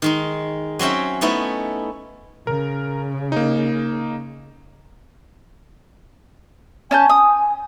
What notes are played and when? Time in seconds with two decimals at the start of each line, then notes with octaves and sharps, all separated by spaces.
0.02 D#3 G#3 D#4
0.79 F#3 C4 C#4 E5 G5
1.21 A3 B3 C#4 D#4 E4
2.47 C#3 A#4
3.32 A#3 D#4
6.91 C#4 G#5 A5 G6
7.09 D#6